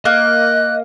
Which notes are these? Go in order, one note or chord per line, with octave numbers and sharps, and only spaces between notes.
A#3 D#5 F#6